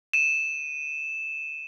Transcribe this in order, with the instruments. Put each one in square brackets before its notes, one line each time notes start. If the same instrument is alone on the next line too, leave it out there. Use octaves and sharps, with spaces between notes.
[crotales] D#7 E7